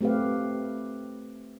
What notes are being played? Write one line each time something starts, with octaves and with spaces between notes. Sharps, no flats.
A3 C4 G4 B4 F5